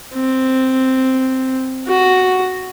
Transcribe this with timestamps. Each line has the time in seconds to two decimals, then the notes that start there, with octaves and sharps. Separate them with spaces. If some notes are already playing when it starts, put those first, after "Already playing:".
0.15 C4
1.88 F#4